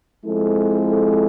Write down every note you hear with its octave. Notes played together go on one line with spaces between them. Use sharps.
F3 G#3 C4 E4 A4